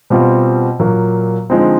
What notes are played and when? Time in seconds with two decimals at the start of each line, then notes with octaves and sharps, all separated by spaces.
0.10 B2 G3 C4 F4
0.79 A#2 F#3 A#3
1.50 D3 F3 G#3 C4 D#4